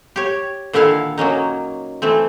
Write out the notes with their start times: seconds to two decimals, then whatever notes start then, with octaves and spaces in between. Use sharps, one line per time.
0.16 G4 C#5
0.73 A#2 D3 D#3 E4 A4 F5
1.18 F#3 A#3 C#4 D#4
2.02 E3 A3 C4